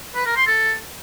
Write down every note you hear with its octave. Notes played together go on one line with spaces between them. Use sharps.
B4
A#4
C6
A4